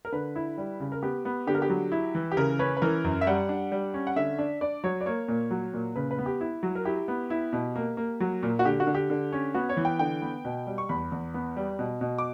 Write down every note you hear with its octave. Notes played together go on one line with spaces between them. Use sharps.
A#4
D3 B4
E4
G3
C#3
A#4
B3 G4
B3
D3 G4
A#4
G4
F#3
E4
E3
G4
C#3 A#4
C#4 B4
B4
E3 A#4
F#2
E5
G3 F#5
D4
G3
C#4
F#5
D3 E5
D4
D4 D5
F#3 C#5
D5
A#3 C#5
A#2
F#3
A#2
C#3 B4
B4
B3
G4
E4
F#3
A#4
E4 G4
B3
E4
B2
A#3
A#3
F#3
A#2
F#4
D3 G4
F#4
D3
G4
D3
C#4
B3 F#4
C#5
E3
G5
D3 G5
B3
B2
G3
C#6
E2 B5
E2
B3
G3
B2
B2
D6